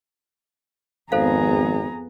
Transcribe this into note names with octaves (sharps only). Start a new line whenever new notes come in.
G#1 F2 B3 G#4 A4 C5 F5 A#5